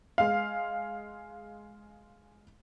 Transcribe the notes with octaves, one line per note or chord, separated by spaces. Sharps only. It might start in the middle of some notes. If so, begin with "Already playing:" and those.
G#3 F5